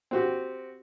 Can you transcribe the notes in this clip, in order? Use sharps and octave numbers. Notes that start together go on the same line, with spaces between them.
C4 F#4 G4